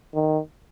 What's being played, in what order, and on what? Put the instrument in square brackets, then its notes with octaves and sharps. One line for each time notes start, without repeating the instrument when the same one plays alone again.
[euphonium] D#3